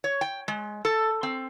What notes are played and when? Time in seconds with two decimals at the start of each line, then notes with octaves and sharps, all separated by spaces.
0.04 C#5
0.21 G5
0.48 G#3
0.85 A4
1.23 C4